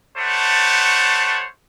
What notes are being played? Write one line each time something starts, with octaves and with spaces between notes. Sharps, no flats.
G3 A3 C5 C#5 F#5 A5